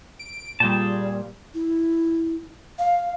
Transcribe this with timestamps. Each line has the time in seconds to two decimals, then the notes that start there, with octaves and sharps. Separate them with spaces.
0.19 D7
0.60 A#2 G3 G#4 G5 A5
1.54 E4
2.79 F5